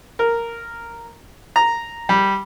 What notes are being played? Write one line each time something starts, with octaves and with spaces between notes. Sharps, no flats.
A#4
A#5
G3